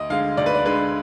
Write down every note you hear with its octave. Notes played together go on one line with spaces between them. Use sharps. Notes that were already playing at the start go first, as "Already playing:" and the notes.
Already playing: D2 D#5
D3 G#3 F5
D2 D5
B4
D5
D3 G#3 B4